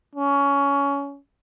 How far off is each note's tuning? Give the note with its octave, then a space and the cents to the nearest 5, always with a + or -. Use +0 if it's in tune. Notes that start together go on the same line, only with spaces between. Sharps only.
C#4 +20